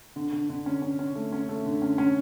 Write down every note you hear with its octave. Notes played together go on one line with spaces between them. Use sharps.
D3
D3
D3
C#4
C#4
C#4
A3
C#4
A3
D3
C#4
C#4